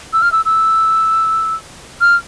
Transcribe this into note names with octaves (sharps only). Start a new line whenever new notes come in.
E6
F6
E6
E6
F6